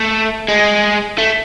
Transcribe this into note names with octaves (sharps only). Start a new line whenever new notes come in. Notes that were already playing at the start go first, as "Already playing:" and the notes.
Already playing: A3
G#3
A3